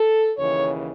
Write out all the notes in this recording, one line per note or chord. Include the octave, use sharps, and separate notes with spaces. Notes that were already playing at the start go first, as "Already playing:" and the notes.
Already playing: A4
D#2 C#3 E3 C#5